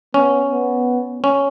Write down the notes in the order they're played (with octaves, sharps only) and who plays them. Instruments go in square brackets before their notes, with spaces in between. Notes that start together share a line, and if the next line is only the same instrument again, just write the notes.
[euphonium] B3 [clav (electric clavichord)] C#4
[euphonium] B3
[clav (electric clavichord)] C#4